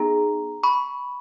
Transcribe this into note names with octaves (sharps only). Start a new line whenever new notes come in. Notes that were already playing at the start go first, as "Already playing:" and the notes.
Already playing: B3 D#4 G#4 A#5
B5 C#6